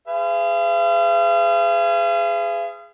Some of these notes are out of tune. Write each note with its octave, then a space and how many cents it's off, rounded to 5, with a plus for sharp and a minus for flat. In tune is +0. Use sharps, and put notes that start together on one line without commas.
G#4 +0 B4 +45 F5 -40